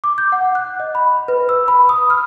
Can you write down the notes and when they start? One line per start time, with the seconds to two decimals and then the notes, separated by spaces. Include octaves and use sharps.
0.04 D6
0.18 G6
0.32 F#5
0.55 F#6
0.80 D#5
0.95 B5
1.28 B4
1.49 E6
1.68 B5
1.89 D#6
2.10 F6